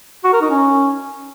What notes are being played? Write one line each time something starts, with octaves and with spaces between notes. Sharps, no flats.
F#4
A#4
D#4
C#4